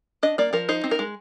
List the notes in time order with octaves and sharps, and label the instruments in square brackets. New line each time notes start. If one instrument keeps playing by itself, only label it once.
[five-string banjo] D4 D#5
A#3 D5
F3 A#4
D#4 C5
C4
A#4
G#3